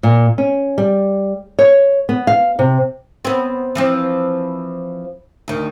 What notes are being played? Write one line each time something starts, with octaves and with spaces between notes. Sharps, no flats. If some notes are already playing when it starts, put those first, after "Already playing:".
A#2
C#4
G3
C#5
B3
F5
C3
B3 C4
E3 F3 C4
D2 D#3